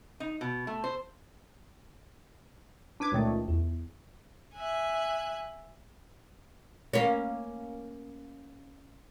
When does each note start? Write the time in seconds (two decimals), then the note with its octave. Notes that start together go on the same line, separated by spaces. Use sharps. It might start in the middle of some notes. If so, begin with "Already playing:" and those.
0.20 D#4
0.41 B2
0.67 A3
0.84 C5
3.00 D4 B4 D6 G#6
3.12 C#2 A#2 D#3 A3
3.48 E2
4.56 E5 G#5 F#6
6.93 A#3 C#4